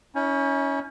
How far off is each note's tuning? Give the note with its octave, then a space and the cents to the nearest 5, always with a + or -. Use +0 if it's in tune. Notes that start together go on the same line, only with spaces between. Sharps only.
C#4 +10 E4 -45